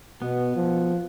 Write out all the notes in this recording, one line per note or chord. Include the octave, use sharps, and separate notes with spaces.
B2 B3
F3